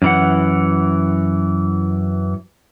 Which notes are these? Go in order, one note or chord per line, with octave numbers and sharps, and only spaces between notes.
F#2 E3 F#5